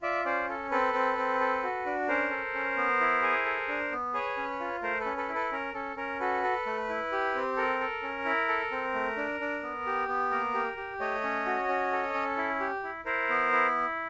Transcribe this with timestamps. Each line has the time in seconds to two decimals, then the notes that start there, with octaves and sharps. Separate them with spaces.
0.02 F4 D5 E5
0.25 C#4 C5 D5
0.49 A4
0.71 C4 A4 B4
0.93 C4
1.17 C4
1.40 A4
1.63 F#4
1.86 D4
2.08 C#4 A#4 C5
2.31 A4
2.54 C#4
2.77 B3
3.00 E4
3.22 G#4
3.45 A4
3.68 D4
3.91 B3
4.14 G#4 B4 C#5
4.37 C#4
4.60 F4
4.82 A3 A#4 C5
5.00 A4 B4
5.05 C#4
5.17 A4 B4
5.29 E4
5.35 A4 B4
5.52 C#4 A#4
5.74 C#4 A4
5.97 C#4 A#4
6.20 F#4 A4 B4
6.43 A4
6.66 A3
6.89 E4
7.12 G4
7.35 C4
7.57 A4 A#4
7.80 A4
8.03 C#4
8.25 E4
8.48 A4
8.71 C4
8.94 A3
9.17 D4
9.40 D4
9.63 B3
9.86 G4
10.08 B3
10.31 A#3 A#4
10.54 G4
10.77 G4
11.00 A3 C#5 D#5
11.24 C#4
11.46 F#4
11.68 C#4
11.92 A4
12.14 C#4
12.37 E4
12.60 G4
12.84 E4
13.05 E4 A#4 C5
13.29 B3
13.52 E4